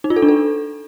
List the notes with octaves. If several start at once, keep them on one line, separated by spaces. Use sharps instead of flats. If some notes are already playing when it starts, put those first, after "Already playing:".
D#4
F4
A4
D4
A4